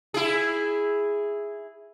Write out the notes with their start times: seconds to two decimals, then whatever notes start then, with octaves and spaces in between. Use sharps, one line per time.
0.14 E4 G#4